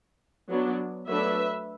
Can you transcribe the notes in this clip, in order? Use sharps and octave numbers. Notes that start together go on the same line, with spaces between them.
F#3 B3 D4
F#3 A3 D4 B4 E5